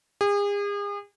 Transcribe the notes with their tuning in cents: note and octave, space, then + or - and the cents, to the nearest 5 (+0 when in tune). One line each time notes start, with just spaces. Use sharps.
G#4 -40